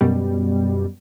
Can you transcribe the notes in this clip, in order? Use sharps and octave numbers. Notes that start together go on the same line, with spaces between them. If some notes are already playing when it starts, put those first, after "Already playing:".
F#2 B2 G3